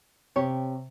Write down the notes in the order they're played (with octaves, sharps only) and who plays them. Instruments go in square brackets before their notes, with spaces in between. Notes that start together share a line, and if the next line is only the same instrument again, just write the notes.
[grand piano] C3 [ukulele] G4 C#5